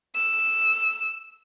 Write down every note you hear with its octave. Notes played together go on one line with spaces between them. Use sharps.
E6